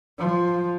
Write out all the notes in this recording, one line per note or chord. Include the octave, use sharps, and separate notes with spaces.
F3